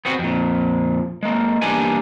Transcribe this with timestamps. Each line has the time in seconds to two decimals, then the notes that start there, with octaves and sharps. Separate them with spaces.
0.05 B3 C4 F#4
0.19 F2 A#2
1.23 G#3 A#3
1.62 E2 G3 A#3 D4 B4 G#5